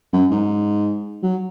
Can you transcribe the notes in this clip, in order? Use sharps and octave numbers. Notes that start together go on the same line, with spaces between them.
F#2
G#2
F#3